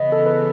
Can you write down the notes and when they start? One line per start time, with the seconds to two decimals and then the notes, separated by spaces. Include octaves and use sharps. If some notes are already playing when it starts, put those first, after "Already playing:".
Already playing: C#3 E3 B3 D#5
0.12 A4
0.26 B4